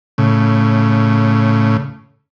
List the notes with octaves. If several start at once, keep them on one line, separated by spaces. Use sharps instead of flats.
A2 C#3